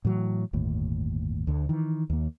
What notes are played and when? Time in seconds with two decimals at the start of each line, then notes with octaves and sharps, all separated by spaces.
0.05 A2 E3 F#3
0.53 G1 D#2 A2
1.47 D2 D3
1.69 D#3 E3
2.10 D#2 A#3